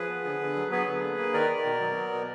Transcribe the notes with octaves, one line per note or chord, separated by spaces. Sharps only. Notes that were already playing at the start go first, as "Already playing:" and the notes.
Already playing: F3 G#4 B4
B3
D3
D3
F#3
B3 G#4 B4
D3
A#3
A#3
D#3 A#4 D5
D#3
B2
F#3
B3
B2